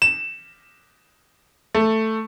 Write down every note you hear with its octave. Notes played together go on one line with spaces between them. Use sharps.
E7
A3